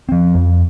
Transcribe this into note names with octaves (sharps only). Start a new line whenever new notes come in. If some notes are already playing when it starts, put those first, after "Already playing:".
F3 C4
F2